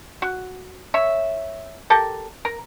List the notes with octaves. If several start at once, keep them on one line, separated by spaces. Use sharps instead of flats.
F#4
C#5 E5
G4 A4 A#4
A#4